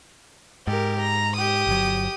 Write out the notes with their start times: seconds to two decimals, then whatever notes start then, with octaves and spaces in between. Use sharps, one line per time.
0.67 G#2 G4 A#4
1.00 A#5
1.36 G4 D#6
1.67 G1 F#3